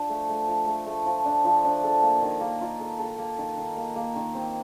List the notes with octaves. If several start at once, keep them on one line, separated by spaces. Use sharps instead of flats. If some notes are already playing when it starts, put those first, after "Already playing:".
Already playing: F3 D4
A3
A3
F3
A3
A3
F3
D4
F3
D4
A4
A#3
D#3
A#3
F4
A4
A4
A#3
D#3
D#3
A#3
A#3
D#3
C4